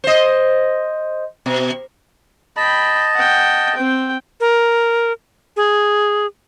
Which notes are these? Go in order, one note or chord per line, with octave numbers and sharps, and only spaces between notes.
C5 D#5
B2
D#5 G5 A5 B5
F#5 G5
C4 G5
A#4
G#4